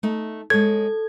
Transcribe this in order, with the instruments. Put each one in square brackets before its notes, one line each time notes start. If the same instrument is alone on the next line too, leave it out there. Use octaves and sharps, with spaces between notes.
[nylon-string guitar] A3 D#4
[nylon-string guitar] G#3 C#5 [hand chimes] A4 G#6